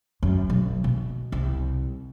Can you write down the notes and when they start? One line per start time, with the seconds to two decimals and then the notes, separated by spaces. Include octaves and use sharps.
0.23 F#2
0.50 B1
0.84 B2
1.32 C2